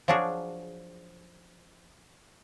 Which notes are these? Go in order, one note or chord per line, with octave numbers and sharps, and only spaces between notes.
F3 F#3 D4 F#4 G#4